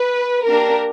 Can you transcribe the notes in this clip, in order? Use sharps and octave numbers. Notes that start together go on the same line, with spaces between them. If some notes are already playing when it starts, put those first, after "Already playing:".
Already playing: B4
A#3 D4 G4 A#4